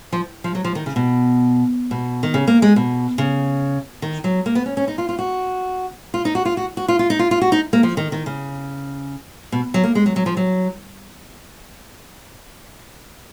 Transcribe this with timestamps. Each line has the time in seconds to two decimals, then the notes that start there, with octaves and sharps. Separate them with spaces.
0.12 F3
0.44 F3
0.55 F#3
0.64 F3
0.75 D#3
0.86 C#3
0.96 B2
1.91 B2
2.23 D#3
2.34 C#3
2.47 A#3
2.62 G#3
2.76 B2
3.18 C#3
4.02 D#3
4.24 F#3
4.46 A#3
4.55 B3
4.66 C#4
4.77 C#4
4.88 D#4
4.98 F4
5.09 F4
5.19 F#4
6.14 F4
6.25 D#4
6.35 F#4
6.45 F4
6.57 F#4
6.77 F#4
6.88 F4
6.99 F4
7.10 D#4
7.19 F4
7.31 F4
7.41 F#4
7.52 D#4
7.73 A#3
7.83 F3
7.97 D#3
8.12 D#3
8.26 C#3
9.52 B2
9.74 F#3
9.84 A#3
9.95 G#3
10.06 F#3
10.16 F#3
10.26 F3
10.37 F#3